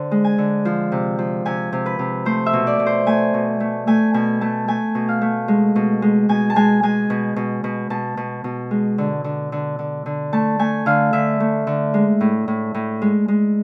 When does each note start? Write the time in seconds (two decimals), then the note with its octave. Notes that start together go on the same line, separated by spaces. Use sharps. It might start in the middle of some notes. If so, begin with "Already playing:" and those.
Already playing: D3 C5
0.11 G#3
0.24 G#5
0.38 D3
0.65 F3
0.92 C3
1.19 F3
1.45 C3 G#5
1.72 C3
1.86 B4
1.99 C3
2.25 A3 C5
2.46 E5
2.53 B2
2.67 D5
2.79 B2
2.86 C5
3.06 A3 G#5
3.34 B2
3.60 A3
3.87 A3 G#5
4.14 B2 G#5
4.41 A3 A5
4.68 A3 G#5
4.95 B2
5.09 F5
5.21 A3
5.48 G#3
5.76 B2
6.02 G#3
6.29 B2 G#5
6.50 A5
6.56 G#3 G#5
6.83 G#3 G#5
7.10 B2
7.36 B2
7.64 B2
7.90 B2 A5
8.17 B2
8.44 B2
8.71 G#3
8.98 D3
9.24 D3
9.52 D3
9.79 D3
10.06 D3
10.33 A3 A5
10.59 A3 G#5
10.86 D3 F5
11.13 D3 E5
11.40 A3
11.67 D3
11.94 G#3
12.21 A2
12.48 A2
12.74 A2
13.02 G#3
13.28 G#3